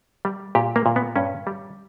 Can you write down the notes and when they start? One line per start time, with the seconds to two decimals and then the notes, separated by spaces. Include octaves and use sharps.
0.25 G3
0.55 A#2 G4
0.76 A#3
0.86 A#2
0.96 B3
1.16 G2 C#4
1.47 G3